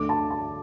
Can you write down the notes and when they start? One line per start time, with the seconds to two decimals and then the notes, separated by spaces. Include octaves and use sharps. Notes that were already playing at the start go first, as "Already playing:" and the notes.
Already playing: D2 D3 A3 D4 D6
0.09 A5
0.30 A5